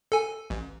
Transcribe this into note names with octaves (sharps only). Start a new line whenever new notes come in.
A4 G#5
A1